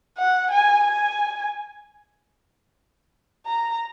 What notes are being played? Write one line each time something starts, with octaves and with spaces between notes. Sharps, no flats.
F#5
G#5
G#5
A#5